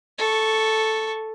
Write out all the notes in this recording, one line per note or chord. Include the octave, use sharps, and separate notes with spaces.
A4 C#6